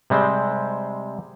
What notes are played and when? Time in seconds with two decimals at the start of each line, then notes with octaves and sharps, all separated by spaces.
0.10 C3 G3 G#3 C4 C5